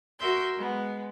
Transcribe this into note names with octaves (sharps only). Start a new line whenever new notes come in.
F#4 A#4 E5 C6 G6
G#3 B3